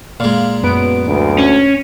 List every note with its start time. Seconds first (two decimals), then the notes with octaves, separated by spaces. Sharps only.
0.20 A#2 G#3 F5
0.63 F#2 B3 D7
1.07 D2
1.39 C#4